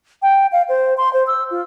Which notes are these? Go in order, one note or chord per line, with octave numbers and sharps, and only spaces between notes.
G5
F5
C5
C6
C5
E6
F4